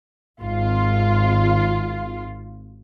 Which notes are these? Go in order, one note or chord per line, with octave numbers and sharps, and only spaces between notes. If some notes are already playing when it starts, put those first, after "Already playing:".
G#1 F4